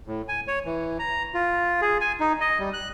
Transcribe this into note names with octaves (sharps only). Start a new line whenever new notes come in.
A2
G#5
C#5
E3
A#5
F4
G#4
G#5
D#4
D#5
G3
F#6